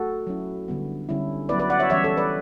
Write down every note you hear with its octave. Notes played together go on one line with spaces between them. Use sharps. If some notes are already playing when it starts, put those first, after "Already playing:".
Already playing: A3 F#4 A4
F#3 C#4 E4
D3 G3 B3
D3 G3 C#4 E4
F#3 B3 E4 B4 D5
B4 D5
D5 F#5
C#5 E5
E3 G3 C#4 C#5 E5
A4 C#5
B4 D5